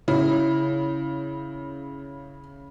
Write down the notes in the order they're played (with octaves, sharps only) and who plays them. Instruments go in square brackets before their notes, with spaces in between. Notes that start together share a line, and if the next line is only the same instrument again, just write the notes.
[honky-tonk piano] C#3 [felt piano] E4